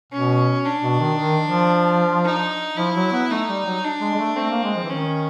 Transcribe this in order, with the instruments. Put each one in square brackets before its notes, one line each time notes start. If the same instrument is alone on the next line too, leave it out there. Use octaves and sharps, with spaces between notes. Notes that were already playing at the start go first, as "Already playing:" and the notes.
[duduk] B2 [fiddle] C#4
[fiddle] D4
[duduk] B2
D#3
D#3
F3
[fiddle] D#4
[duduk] F3 [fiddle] E4
[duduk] F#3
B3
[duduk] A3 [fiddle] D#4
[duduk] G3
F#3
[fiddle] D4
[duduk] G#3
G#3
A3
[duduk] A3 [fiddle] C4
[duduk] A#3
G#3
F3
E3
[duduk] D#3 [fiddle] C#4